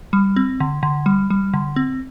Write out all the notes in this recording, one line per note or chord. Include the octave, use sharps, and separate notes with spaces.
G3
C4
D3
D3
G3
G3
D3
C4